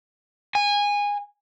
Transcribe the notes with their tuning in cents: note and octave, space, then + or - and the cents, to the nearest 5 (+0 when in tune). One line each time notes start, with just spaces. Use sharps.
G#5 -20